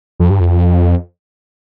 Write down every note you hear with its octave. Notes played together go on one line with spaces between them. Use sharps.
F2
G2
F2